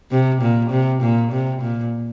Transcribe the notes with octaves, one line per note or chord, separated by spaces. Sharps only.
C3
A#2
C3
A#2
C3
A#2